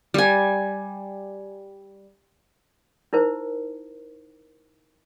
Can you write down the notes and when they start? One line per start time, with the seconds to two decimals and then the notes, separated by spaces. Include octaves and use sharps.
0.14 G3 G#5
3.13 D#4 E4 A#4 C5